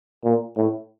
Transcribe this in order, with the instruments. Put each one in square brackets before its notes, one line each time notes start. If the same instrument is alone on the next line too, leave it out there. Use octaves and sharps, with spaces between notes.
[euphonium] A#2
A2